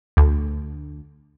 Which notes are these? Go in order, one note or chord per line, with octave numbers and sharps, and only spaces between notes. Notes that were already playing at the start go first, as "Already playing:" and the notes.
D2